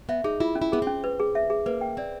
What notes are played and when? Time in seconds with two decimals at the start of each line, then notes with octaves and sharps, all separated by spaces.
0.09 B3 E5
0.24 D#4 G#4
0.40 E4 F4
0.55 C#4
0.62 E4
0.72 B3 G#4
0.82 C4 C#4
1.04 B4
1.20 G#4
1.35 E5
1.50 G#4
1.66 A#3 B4
1.81 G5
1.97 C4 D5